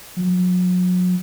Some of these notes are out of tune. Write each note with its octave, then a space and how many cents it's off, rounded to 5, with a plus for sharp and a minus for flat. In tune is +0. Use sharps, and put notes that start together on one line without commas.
F#3 -35